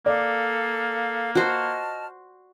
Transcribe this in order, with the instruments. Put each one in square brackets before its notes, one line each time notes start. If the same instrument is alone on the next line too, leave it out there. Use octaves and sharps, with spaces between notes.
[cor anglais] A#3 [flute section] A4 F5 [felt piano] D5
[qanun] F#4 C5 [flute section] D#5 A5 F6